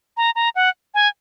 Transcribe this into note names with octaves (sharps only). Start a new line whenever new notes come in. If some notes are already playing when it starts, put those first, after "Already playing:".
A#5
A#5
F#5
G#5